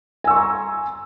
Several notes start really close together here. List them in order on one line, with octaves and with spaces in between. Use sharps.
G#5 E6 C#6 C6 A#5